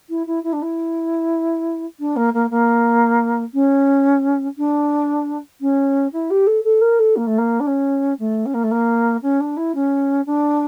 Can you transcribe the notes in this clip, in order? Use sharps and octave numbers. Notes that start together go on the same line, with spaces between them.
E4
E4
E4
D4
E4
D4
A#3
A#3
A#3
C#4
D4
C#4
E4
G4
A4
A4
A#4
A4
A#3
A3
A#3
D4
C#4
A3
C#4
A#3
A3
A#3
C#4
D4
E4
C#4
D4